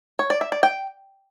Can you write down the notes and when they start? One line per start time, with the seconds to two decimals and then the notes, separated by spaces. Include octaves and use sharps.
0.19 C#5
0.30 D5
0.41 E5
0.52 D5
0.63 G5